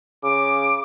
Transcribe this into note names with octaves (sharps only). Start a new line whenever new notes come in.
C#3 D6